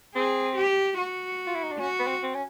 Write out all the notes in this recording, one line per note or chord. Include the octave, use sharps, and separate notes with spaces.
C4 G#4
G4
F#4
F4
E4
D#4
D4
C#4 F#4
B3
C4
C4
C#4